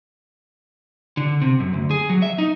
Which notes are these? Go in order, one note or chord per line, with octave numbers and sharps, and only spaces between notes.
D3
C3
F#2
D2
G#4
F#3
E5
D#4